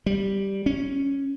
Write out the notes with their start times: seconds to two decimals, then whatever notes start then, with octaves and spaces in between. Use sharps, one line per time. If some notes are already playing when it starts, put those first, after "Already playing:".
0.06 G3
0.66 C#4